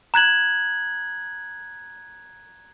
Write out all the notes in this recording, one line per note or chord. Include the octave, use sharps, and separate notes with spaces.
A#5 F#6 G#6 F#7